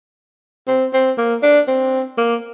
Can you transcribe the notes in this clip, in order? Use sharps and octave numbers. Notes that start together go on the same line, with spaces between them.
C4
C4
A#3
D4
C4
A#3